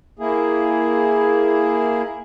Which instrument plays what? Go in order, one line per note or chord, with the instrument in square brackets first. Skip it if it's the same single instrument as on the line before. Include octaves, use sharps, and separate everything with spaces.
[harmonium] A#3 E4 G#4